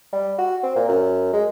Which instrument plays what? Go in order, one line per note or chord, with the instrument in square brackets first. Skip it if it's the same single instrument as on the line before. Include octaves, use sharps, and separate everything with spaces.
[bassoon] G3
F#4
C4
A#2
F#2
G#3